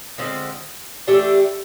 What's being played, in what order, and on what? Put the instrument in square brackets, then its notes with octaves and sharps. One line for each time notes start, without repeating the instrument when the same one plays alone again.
[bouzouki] D3 F3 G#3 C4
E3 A3 D4 G4